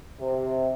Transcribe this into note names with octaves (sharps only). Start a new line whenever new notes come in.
C3